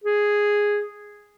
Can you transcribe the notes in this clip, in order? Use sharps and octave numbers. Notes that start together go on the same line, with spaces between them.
G#4